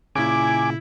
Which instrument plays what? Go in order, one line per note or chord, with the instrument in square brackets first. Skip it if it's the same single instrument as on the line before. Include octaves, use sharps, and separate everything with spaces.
[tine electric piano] A#2 C#3 [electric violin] E4 [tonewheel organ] G#5 D6